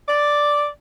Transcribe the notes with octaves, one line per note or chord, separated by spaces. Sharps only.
D5